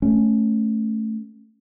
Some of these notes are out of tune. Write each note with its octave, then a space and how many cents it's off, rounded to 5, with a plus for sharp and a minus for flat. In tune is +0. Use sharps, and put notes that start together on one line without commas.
A3 +0 C#4 +0